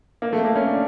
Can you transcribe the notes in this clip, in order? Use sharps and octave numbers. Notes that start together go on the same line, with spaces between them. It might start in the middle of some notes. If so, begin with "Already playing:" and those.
A#3
A3
A#3
C#4
D4